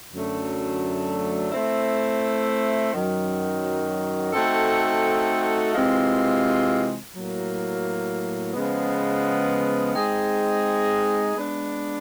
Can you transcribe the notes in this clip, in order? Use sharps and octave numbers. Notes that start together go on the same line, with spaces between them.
F#2 D3 F#3 A3
A3 C4 E4
F#2 D#3 F#3
A3 C4 D#4 F#4 A4
C3 E3 G#3 C4 F4
A2 F#3 A#3
C#3 F3 G#3 B3
G#3 C4 D#4 G#4
G#3 B3 D4